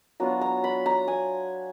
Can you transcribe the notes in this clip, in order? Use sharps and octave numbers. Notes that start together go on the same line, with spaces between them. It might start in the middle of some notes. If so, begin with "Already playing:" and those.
F#3 B3 D4 F4 A#5
A#5
B5
A#5
G#5